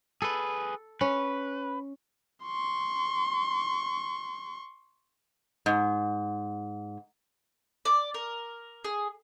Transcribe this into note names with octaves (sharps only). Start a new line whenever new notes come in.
G#4 A4 B4
C#4 B4
C6 C#6
G#2
D5
A#4
G#4